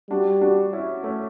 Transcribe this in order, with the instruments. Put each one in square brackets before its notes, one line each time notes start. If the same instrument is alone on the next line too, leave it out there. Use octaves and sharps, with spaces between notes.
[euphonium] G3 [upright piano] D4 F#4
[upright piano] D4 F#4
C#4 E4
A3 C#4